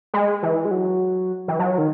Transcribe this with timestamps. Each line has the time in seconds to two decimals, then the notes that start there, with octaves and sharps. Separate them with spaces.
0.14 G#3
0.43 E3
0.65 G#3
0.71 F#3
1.48 E3
1.59 F#3
1.78 D#3